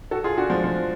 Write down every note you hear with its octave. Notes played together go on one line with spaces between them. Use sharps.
F#4 A4
F4 G#4
D4 F#4
F3 G#3
F3